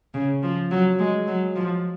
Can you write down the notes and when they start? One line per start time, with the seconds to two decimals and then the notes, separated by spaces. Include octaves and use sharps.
0.14 C#3
0.43 F3
0.71 F#3
0.99 G#3
1.27 F#3
1.56 F3